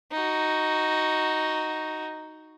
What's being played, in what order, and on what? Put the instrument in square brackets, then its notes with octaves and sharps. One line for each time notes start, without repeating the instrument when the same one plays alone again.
[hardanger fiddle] D#4 F#4